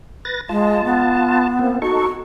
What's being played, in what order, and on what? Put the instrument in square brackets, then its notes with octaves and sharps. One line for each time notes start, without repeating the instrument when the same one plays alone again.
[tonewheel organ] B4 A6 A#6
[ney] G#3 [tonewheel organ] F4 A5
[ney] B3
[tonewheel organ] A#3 C4
[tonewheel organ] D#4 A4 C#6 [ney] F#4